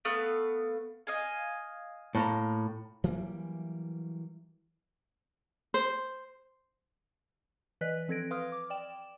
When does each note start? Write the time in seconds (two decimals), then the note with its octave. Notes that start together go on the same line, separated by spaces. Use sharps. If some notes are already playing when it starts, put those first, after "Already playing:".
0.05 A3 B3 F5
1.07 D#5 F5 G#5
2.15 A2 A#3 A#5
3.04 E3 F#3 G3 A#3
5.74 C5
7.81 E3 B4 D5 D#5 F#6 B6
8.08 F3 C4 A4 G#6 A#6 D7
8.30 B4 F5 C6 D#6 F6
8.52 D6
8.70 D5 G5 E7